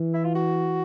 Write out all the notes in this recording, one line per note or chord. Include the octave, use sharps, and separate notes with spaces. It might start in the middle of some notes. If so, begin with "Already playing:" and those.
Already playing: E3
E4
F4
F#4